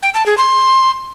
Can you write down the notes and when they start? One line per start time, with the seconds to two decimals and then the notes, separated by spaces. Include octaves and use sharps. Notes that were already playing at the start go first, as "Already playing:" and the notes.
0.03 G5
0.14 A5
0.26 G#4
0.38 C6